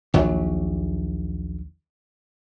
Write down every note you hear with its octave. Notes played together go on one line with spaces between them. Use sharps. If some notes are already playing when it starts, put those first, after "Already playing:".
A#1 D#2 F#3